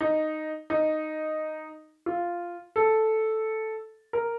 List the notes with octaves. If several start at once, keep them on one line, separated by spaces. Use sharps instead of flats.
D#4
D#4
F4
A4
A#4